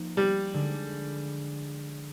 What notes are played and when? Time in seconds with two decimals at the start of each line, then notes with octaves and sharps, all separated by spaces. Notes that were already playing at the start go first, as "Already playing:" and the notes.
Already playing: F3 A#3 D#4
0.17 G3
0.54 D3 G#3 D4